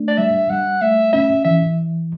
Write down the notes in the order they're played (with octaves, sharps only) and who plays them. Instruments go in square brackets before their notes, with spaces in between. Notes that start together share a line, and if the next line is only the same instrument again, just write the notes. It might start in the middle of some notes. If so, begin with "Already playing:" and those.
Already playing: [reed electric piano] A3 D4
[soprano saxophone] D5
[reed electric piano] G3 [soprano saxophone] E5
[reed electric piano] G3 [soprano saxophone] F#5
[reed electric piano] A3 [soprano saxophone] E5
[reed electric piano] C#4 [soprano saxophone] E5
[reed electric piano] E3 [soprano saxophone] E5